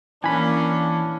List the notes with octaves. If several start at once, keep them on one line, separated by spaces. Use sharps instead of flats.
E3 A#3 C#4 D4 G#5 B5